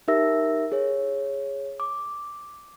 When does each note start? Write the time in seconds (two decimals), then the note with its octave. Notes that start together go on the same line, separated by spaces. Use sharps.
0.08 D#4 G4 A#4 E5 E6 A#6
0.72 G#4 C#5
1.80 D6